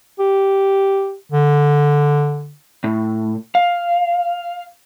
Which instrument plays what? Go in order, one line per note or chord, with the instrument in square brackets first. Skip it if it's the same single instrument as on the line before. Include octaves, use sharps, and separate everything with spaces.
[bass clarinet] G4
D3
[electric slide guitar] A2
F5